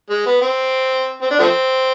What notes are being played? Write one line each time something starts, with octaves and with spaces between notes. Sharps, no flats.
G#3
B3
C4
C4
D4
F3 A3 C4